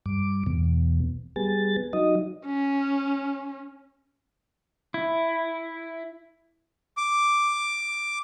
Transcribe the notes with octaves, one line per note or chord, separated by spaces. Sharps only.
G2 D6
E2 B2
G3 B3 G#4 A6
F#3 D#4 D#5
C#4
E4
D6